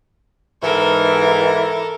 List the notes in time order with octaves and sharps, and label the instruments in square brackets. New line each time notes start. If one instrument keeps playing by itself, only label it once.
[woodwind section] G#2 E3 [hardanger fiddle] A4 A#4